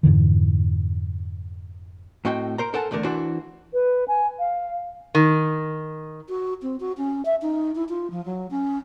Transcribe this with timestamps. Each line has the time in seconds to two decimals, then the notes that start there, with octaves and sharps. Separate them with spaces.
0.03 F2 G#2 D3 E3
2.25 A2 C4 F#4 D#5 G5
2.58 A#4 C5 A#5
2.74 A4 A#4 C5 F#5 G#5 A5
2.91 E2 D3 A3 D4 A#4
3.04 E3 D4 E4 F#4 C5
3.73 B4
4.08 G#5
4.39 F5
5.15 D#3
6.29 F#4
6.62 C4
6.80 F#4
6.98 C#4
7.25 E5
7.42 D#4
7.75 E4
7.89 F4
8.11 F3
8.25 F#3
8.51 C#4